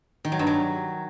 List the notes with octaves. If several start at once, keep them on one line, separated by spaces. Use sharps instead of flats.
D#3
F#3
G2
F#3